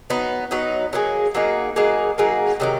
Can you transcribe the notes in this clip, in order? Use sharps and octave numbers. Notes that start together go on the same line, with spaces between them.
F#3 B3 D#4
F#3 B3 D#4
F#3 A#3 D#4 G#4
F#3 A#3 D#4 G#4
F#3 A#3 D#4 G#4
F#3 A#3 D#4 G#4
C3 D#3 F#3 A#3